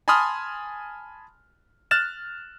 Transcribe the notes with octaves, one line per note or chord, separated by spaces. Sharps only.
G#5 A5 B5 C6 D#6 F6
F6 F#6 A6 E7